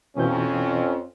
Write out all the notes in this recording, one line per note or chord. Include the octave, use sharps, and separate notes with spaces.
F2 B2 E3 C#4 G6